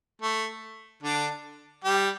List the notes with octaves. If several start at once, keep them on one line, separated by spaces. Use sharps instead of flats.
A3
D3 D4
G3 G4